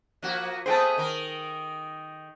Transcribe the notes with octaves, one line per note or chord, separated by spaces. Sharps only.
F3 A#3 F#4
A3 B3 G#4 C5 G5 A5
D#3 A#4